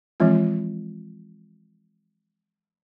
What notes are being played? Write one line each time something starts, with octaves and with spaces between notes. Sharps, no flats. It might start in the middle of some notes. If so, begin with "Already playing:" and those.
E3 F3 G#3 C4 F4